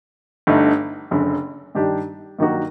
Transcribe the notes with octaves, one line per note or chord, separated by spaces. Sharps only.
G1 G2 D3 A3 D#4
F#1 F#2 D3
G2 D#3 G3 D4 G4
G2 D#3 F#3 A#3 F#4